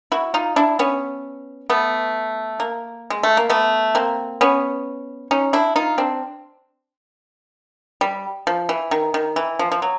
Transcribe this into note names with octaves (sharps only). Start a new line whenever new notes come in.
E4 F#4
D#4 F4
D4 E4
B3 C#4
A3 B3
A#3
G#3
A3
A#3
A3 B3
A#3 C4
B3 C#4
C#4 D#4
D4 E4
D#4 F4
C4 D4
G3
F3
E3
D#3
D#3
E3
F3
F3
F#3